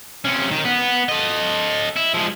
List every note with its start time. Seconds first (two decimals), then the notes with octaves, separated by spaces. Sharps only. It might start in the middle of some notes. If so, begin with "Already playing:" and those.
0.25 C3 C#4
0.51 D#3
0.65 B3
1.09 A4 D#5
1.97 E4
2.14 F3 G#3